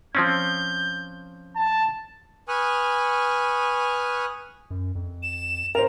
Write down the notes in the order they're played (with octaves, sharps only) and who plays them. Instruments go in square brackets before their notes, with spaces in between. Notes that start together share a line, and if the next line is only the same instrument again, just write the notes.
[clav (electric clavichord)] F3 C4 C#4 [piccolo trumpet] G6
[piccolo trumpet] A5
[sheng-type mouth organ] B4 G#5 C#6 D#6 F6 F#6
[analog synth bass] F#2
F2
[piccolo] E7
[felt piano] A#4 C5 [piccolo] F7